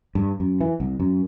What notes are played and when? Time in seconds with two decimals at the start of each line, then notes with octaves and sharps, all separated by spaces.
0.15 G2
0.40 F#2
0.61 E3
0.80 C2
1.00 F#2